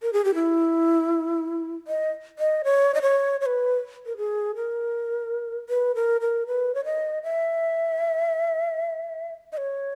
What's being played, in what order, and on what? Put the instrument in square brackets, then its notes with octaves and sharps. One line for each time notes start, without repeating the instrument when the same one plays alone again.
[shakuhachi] A#4
G#4
G4
E4
D#5
D#5
C#5
D#5
C#5
C#5
B4
A#4
G#4
A#4
B4
A#4
A#4
B4
C#5
D#5
E5
D#5
C#5